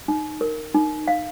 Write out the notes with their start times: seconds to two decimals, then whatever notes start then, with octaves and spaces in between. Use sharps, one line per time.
0.08 D#4
0.41 A#4
0.74 D#4
1.08 F5